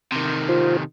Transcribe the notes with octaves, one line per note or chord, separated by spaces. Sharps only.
C3 D#3
F4 C5